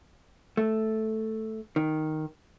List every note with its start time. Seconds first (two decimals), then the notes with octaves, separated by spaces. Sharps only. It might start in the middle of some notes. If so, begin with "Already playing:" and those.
0.57 A3
1.76 D#3